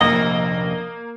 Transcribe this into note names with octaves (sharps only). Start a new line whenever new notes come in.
F1 A#1 D#2 A#3 D#5